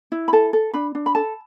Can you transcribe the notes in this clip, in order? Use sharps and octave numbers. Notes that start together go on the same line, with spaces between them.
E4
B5
A4 A5
A4
D4 B5
D4
B5
A4 A5